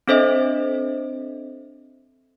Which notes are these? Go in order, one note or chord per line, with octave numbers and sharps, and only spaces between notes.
C4 D4 A4 C5 D#5 E5